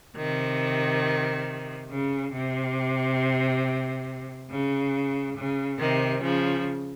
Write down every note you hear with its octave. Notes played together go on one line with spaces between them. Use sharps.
C3 D#3
C#3
C3
C#3
C#3
C3 D#3
C#3 F3